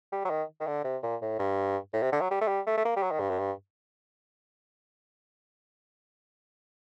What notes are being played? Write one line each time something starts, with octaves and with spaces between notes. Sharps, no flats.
G3
F#3
D#3
D#3
D3
C3
A#2
A2
G2
A2
C3
D3
F#3
G3
A3
G3
A3
A3
A#3
G3
F#3
D#3
G2
F#2
G2